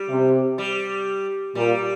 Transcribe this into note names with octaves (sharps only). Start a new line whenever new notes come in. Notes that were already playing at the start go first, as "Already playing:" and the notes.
Already playing: G3
C3
G3
A#2 G3